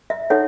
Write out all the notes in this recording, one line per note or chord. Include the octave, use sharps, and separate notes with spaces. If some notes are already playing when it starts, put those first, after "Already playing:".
E5
D#4 A4 C#5 F#5